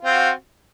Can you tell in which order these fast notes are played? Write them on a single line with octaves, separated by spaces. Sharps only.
F4 C4 F#4